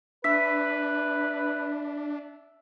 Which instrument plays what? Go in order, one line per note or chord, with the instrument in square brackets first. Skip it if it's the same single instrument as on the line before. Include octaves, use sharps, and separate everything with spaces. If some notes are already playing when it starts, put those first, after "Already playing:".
[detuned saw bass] D4 [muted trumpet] B4 [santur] E5 [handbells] B6